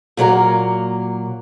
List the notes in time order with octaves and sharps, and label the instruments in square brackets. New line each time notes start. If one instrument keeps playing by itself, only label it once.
[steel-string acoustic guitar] A#2 F#3 A#3 A#4